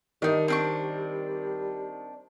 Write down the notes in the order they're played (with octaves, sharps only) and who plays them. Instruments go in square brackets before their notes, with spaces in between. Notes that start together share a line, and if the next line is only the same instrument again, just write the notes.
[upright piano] D#3 [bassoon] G3 [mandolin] D4 D#4
[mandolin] C4 D4 C#6